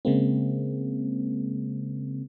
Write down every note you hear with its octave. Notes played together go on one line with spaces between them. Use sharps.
C#3 G#3 A#3 C4